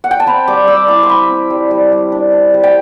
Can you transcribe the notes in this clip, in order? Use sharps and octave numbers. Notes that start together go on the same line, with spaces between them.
F#5
G5
A5
C4 B5
G3 D6
G3 E6
E4 D6
C6
C4 B5
C4
G3
G3
G3
D4
D4
G3
G5